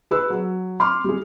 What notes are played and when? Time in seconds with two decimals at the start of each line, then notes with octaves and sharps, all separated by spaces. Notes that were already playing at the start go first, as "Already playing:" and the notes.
0.11 G#4 B4 E6
0.30 F#3
0.80 C6 D6 F6
1.04 G3 G#4